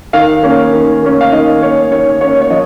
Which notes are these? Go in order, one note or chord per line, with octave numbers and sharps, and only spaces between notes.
D#3 F5
A#3 C#4
D#3
A#3 C#4
F5
D#3 D#5
A#3 C#4 C#5
D#3 C#5
A#3 C#4 C#5
C#5
F3 D#5